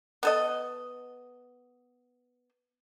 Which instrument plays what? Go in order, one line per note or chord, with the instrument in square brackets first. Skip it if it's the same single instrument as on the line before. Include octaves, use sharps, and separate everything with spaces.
[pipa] B3 A4 D#5